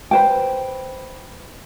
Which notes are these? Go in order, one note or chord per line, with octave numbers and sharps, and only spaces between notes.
B4 C5 G5